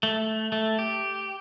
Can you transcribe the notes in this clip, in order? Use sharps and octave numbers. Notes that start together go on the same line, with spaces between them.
A3
A3
G4